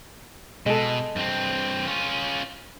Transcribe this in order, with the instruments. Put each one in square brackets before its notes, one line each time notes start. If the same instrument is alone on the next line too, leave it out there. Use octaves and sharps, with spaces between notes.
[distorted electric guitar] B2 [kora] G#3 A4
[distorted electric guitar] G2 C4
C#4 F4